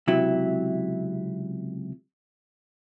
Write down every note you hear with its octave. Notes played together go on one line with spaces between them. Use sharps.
C#2 C3 F#3 E4